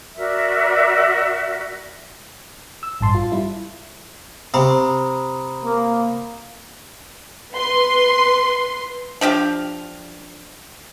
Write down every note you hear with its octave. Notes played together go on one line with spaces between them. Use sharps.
F#4 A#4 D5 E5
E6
A1 G2 A5 C6
F4
G3 E4
C3 A#5 B5 D#6
A#3
B4 C6
F3 D4 G4 F5